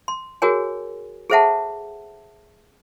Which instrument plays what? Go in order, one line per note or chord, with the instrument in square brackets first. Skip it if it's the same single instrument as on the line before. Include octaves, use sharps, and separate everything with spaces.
[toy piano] C6
F#4 G#4 A#4 C#5 G#5
G#4 A4 C5 E5 F#5 A5